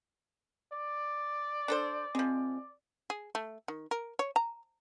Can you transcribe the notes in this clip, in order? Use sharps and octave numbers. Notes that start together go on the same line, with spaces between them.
D5
D4 A4 C5
F3 G#3 C4
G#4
A3
D#3
A#4
C#5
A#5